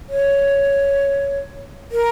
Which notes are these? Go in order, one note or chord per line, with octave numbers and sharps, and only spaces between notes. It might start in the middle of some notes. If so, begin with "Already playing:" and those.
C#5
A#4